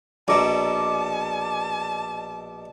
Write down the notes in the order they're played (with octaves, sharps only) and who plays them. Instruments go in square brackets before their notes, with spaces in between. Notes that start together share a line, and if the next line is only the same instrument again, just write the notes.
[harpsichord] A#1 B2 [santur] D5 D#5 A#5 [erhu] A5